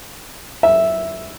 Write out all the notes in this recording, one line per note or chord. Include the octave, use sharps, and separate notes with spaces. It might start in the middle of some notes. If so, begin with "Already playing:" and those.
E5